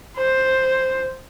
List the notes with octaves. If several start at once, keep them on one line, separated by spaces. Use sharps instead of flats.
C5